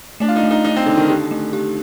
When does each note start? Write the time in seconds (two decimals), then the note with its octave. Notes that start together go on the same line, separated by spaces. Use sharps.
0.20 A3 D4
0.28 F4
0.36 D#4
0.43 A3
0.51 D#4
0.64 A3 D#4
0.76 C4
0.86 D3 D#4
0.97 D#3
1.09 D3 G4
1.31 A3
1.53 G4